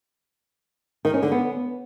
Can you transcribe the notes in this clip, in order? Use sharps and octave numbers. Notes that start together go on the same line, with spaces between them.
D#3
C#4
D3
B3